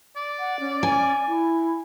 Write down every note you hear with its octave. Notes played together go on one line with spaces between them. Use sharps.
D5
F#5
C#4
G#5
E4